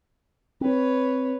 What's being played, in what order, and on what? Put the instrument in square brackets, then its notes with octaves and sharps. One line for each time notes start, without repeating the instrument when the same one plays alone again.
[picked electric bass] C4 [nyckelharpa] B4 C#5